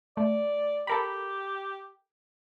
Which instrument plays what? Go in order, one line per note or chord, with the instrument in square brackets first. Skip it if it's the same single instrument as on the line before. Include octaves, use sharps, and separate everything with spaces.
[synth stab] A3 [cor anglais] D5
[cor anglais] G4 [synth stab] A4 A#4 B5